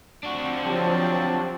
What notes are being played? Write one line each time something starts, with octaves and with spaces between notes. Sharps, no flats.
F3 C4 D4 F#4
F#3 G4 A5